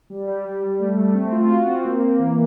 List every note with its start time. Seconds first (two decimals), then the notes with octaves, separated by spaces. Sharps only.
0.10 G3
0.28 G3
0.45 G3
0.62 G3
0.80 A3
0.97 A3
1.15 C4
1.32 F4
1.50 F#4
1.67 C4
1.85 A#3
2.02 A#3
2.19 E3